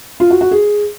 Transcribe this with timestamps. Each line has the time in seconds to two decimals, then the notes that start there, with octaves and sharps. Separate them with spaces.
0.20 F4
0.30 F#4
0.41 F#4
0.51 G#4